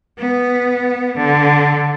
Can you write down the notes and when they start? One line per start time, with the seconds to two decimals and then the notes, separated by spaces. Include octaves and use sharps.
0.18 B3
1.17 D3